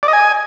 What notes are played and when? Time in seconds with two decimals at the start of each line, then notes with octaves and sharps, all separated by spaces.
0.03 D5
0.08 D#5
0.13 G#5